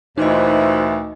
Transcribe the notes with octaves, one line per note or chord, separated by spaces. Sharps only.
D2 A#2 E3 D#4 F#4 C5 D#5